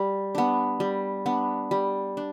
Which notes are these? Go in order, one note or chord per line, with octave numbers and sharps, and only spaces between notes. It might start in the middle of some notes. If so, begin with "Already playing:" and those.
Already playing: G3
B3 D4
G3
B3 D4
G3
D4